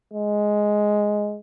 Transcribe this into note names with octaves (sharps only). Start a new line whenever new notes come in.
G#3